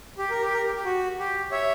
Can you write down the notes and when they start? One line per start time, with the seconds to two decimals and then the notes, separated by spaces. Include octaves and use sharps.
0.18 G4
0.30 A#4
0.41 G4
0.54 A#4
0.66 G4
0.76 G4
0.85 F#4
1.19 G4
1.51 C#5 E5